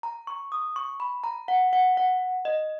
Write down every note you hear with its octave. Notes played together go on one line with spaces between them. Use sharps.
A#5
C#6
D#6
C#6
B5
A#5
F#5
F#5
F#5
D#5